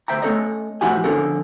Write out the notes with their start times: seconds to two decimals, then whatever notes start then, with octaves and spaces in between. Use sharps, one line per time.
0.08 D2 C5 E5 G5 A#5
0.22 A3 C#4 A4 C#5 D#5
0.81 A2 F3 E4 F#4 G4 G#5
1.04 D3 F3 C#4 F#4 A4 A#4